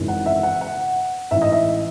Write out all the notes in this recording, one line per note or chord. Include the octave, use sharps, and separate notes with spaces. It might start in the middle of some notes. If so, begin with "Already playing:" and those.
Already playing: G#1 F#2 C#3 E3
F#5
E5
F#5
F#5
A1 G#2 E3 E5
D#5
E5